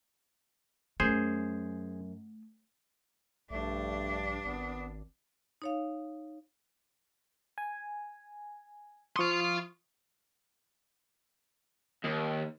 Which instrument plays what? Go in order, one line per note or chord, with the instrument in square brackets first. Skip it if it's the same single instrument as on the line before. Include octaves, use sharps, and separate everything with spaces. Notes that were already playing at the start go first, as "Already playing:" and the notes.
[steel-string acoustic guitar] F#2 [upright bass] A3 [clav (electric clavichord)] G#4 C5
[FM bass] A#1 [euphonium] G2 [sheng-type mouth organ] A3 [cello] D4
[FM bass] G#1 [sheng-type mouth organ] B3
[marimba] D#4 C#5 F5
[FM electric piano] G#5
[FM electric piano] F3 C#6 D#6 [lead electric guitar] F5 C6
[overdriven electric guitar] D#2